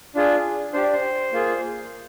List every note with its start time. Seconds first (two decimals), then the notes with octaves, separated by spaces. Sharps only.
0.15 D4 F4 G#4
0.73 D4 G4 C5
0.83 D5
0.93 C5
1.33 A#3 F4 G#4